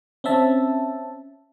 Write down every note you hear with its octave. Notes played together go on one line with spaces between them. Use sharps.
C4 C#4 E5 A5